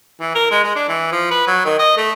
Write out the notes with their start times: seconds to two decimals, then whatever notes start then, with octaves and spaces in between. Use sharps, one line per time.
0.21 E3
0.35 A#4
0.51 G#3
0.64 G#3
0.76 D4
0.89 E3
1.12 F3
1.31 B4
1.47 F#3
1.65 D#3
1.79 D#5
1.97 A3